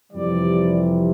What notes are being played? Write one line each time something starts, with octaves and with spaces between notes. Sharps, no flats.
F2 C3 E3 G3 D5